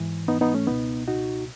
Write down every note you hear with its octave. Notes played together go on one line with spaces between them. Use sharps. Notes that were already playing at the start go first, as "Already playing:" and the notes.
Already playing: G#2 E3
B3 D#4
B3 D#4
A3 C#4
C#2 B2 B3 D#4
D#4 F#4